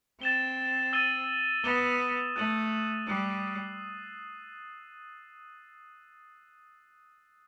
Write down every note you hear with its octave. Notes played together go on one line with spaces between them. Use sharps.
C4 A6 E7 G7
E6 A6 D#7 G7
B3 D#6 A6 E7 G7
A3 F#6 A6 D#7 F#7
G3 D#6 F#6 C7